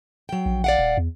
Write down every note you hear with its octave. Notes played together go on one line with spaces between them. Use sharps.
F#3 G5
A#1
D5 F5 F#5
D#1
E2